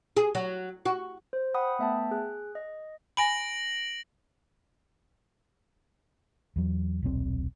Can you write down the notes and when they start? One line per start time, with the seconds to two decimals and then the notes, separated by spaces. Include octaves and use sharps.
0.17 G#4
0.35 F#3
0.86 F#4
1.33 C5
1.54 F#5 G5 B5 D#6
1.79 A3 B3 E5 G5 A5
2.11 G#4 F#6
2.55 D#5
3.17 G#5 B5 A#6 D7 F#7
6.56 E2 F#3
7.02 D#1 B1 C4